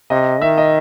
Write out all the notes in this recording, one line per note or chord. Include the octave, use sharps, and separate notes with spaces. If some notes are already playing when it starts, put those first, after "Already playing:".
C3 D#5
D#3 E5
D#5